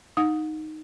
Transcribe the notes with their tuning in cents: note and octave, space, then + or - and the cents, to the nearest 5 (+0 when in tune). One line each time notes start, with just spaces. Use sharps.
D#4 +0 F#5 -40 D#6 +5